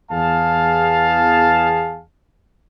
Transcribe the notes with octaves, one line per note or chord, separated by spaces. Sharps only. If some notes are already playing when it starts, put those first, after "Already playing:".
E2 G#4 F5 A5